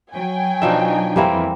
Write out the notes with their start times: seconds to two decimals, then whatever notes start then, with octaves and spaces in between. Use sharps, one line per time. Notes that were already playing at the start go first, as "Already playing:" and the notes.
0.11 F#3 G5 G#5
0.62 B2 F3 D4 D#4 E5
1.16 F2 E3 G3 A#3 C4 E4